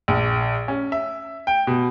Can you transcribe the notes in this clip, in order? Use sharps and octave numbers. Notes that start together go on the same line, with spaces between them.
A#1
C#4
E5
G5
B2